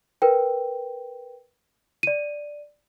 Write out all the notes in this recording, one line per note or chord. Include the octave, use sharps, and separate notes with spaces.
A#4 B4 G5
D5 D#7